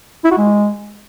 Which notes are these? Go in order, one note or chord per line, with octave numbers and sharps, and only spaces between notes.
E4
F#4
G#3